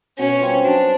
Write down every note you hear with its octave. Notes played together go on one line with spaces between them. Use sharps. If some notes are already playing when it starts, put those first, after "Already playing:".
B2 C#4
G3 C4 F4
F#3 D4